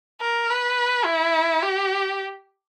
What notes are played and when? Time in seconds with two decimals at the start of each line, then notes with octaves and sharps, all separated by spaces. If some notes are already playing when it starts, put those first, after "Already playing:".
0.21 A#4
0.50 B4
1.05 E4
1.63 G4